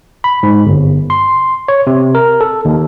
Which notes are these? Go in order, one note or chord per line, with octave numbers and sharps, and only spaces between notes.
B5
G#2
G1
C6
C#5
C3
A#4
A4
D#2